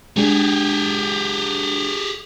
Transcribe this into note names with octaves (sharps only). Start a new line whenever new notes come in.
G#3 D4 G4 G#4